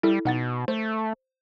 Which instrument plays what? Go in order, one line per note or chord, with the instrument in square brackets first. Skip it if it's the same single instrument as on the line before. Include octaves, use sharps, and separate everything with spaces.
[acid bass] G3 [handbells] E4 A4
[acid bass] B2 [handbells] D#4 F#5 A6
[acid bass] A3 [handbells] C5